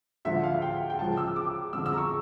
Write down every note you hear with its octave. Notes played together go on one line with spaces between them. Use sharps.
D2 D3 F3 E5
F5
G5
G5
C#2 C#3 F3 A5
E6
D6
F2 D3 F3 E6
E6
A#5
C#6